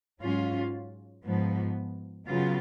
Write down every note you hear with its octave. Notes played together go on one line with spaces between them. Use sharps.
G#2 F#3 C#4 F4
G#2 F3 B3
C#3 F#3 B3 F4